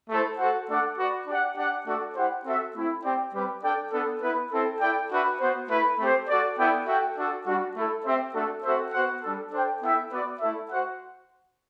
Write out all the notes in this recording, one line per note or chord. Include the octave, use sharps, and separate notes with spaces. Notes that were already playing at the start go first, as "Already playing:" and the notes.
A3 E4 A4 C5
F#4 A4 C5 F#5
A3 D4 A4 D5 F#5
F#4 B4 D5
D4 G4 D5 F#5
D4 G4 D5 F#5
A3 D4 F#4 A4 D5
E4 G4 C5 F#5
C4 F#4 A4 E5
A3 C4 E4
C4 G4 D5 G5
G3 C4 G4 B4
D4 A4 D5 G5
B3 D4 A4
B3 E4 B4
C4 E4 A4
E4 A4 D5 G5
D4 F#4 B4 E5
B3 F#4 C5
A3 E4 B4
A3 C4 G4 C5
F#4 A4 D5
B3 E4 A4 D5 G5
F#4 A4 E5 G5
D4 F#4 A4
G3 D4 F#4
A3 E4 A4
C4 G4 C5 E5
A3 D4 F#4 A4
C4 F#4 A4 C5 E5
B3 F#4 C5 F#5
G3 D4 A4
D4 A4 C5 G5
B3 E4 A4 E5 G5
B3 F#4 B4 D5
A3 E4 A4 E5
F#4 C5 F#5